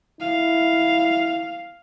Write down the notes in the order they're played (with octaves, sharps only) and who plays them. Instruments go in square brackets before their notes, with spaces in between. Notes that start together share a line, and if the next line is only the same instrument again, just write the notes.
[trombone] E4 [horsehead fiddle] F5